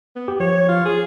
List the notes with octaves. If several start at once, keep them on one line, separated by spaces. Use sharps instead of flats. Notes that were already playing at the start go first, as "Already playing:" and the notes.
B3
G4
F3 C#5
F4
G#4